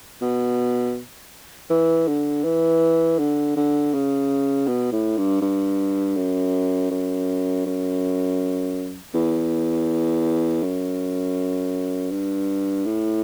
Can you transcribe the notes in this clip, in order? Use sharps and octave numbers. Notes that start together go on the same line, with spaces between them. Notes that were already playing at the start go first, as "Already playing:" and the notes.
B2
E3
D3
E3
D3
D3
C#3
B2
A2
G2
G2
F#2
F#2
F#2
E2
F#2
G2
A2